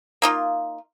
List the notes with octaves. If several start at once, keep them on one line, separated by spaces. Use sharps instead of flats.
A#3 D#4 F4